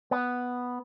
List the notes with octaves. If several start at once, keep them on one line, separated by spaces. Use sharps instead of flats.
B3